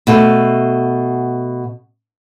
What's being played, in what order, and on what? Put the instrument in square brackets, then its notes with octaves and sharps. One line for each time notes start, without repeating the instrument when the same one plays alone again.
[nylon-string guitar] B2 A3